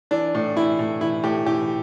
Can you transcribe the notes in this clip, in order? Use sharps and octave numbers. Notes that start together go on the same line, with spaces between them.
E3 D4
A2
E3 E4
A2
E3 E4
A2 G4
E3 G4